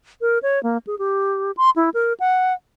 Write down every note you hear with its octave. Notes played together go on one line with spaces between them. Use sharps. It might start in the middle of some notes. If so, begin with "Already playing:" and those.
A#4
C#5
A#3
G#4
G4
C6
E4
A#4
F#5